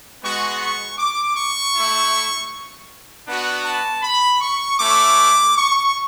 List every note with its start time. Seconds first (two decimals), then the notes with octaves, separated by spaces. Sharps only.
0.22 G#3 B3 F#4 C#6
0.60 C#6
0.98 D6
1.36 C#6
1.74 A3 E4
3.27 B3 D4 F#4
3.64 A5
4.02 B5
4.40 C#6
4.78 A3 C#4 E4 D6
5.55 C#6